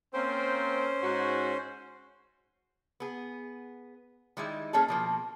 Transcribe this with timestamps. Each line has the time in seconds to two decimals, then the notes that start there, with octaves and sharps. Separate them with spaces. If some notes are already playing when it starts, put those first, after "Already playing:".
0.14 A#3 C4 C#4 C5
1.03 G#2 F#4
3.00 B3 G#4
4.37 D#3 G3 G#3 D#4 E4
4.73 A#3 C#4 G#4 A4
4.88 B2 F3 A#3